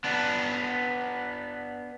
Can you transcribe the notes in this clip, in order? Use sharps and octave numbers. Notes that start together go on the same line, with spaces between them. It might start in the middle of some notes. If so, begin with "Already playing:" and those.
B3 D4